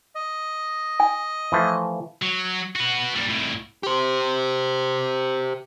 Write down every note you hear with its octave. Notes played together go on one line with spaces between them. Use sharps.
D#5
G#5
E3 F3 A3
F#3
F#4 B4
A#2 G3
C2 A2
G4 C5